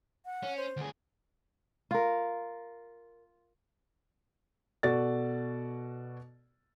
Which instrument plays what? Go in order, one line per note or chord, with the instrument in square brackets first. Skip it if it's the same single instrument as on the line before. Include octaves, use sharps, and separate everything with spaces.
[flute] F#5
[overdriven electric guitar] C#4
[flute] C5
[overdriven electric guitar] D2 G#4
[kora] F4 A#4
[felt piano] B2 F#4 A4 D5 A6